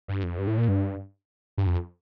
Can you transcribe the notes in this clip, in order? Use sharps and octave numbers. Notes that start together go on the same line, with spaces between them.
G2
F2
G2
A2
A#2
G2
G2
F2